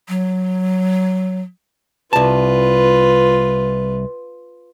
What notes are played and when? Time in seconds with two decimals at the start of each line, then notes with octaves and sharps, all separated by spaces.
0.08 F#3
2.13 C2 F4 B4 A5